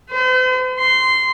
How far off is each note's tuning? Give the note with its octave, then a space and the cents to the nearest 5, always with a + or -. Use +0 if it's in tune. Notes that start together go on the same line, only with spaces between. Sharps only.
C5 -45
C6 -15